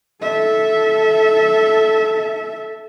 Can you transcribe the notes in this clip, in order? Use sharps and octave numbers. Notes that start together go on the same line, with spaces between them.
A4 E5